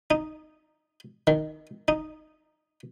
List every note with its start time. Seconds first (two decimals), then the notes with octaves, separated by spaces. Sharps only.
0.11 D#4
1.27 D#3
1.88 D#4